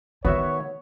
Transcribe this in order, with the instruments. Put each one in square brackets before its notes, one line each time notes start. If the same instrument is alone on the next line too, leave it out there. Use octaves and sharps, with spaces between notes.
[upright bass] D#3 [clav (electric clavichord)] B3 F#4 E5 [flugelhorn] C#5